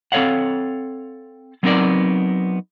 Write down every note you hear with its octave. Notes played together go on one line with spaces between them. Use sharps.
C4 A4 A#4 C#5 F5 F#5
F#3 B3 C4 D#4 A#4 D5